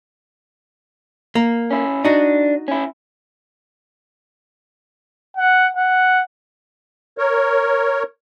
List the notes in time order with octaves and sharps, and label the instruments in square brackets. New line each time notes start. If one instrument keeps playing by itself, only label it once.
[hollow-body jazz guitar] A#3
[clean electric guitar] C#4 E4
[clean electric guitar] D4 [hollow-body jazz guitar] D#4 F#4
[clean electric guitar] C#4 E4
[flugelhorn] F#5
F#5
[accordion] A#4 C#5